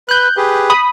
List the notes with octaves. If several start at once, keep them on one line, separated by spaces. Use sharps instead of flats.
B4 F#6 G6
G4 G#4 B4
B5 D#6